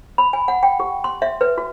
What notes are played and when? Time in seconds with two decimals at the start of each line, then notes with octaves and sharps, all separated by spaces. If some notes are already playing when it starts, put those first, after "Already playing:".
0.18 B5
0.33 G#5
0.48 F#5
0.63 G5
0.80 G4
1.04 C6
1.22 E5
1.41 B4
1.58 F#4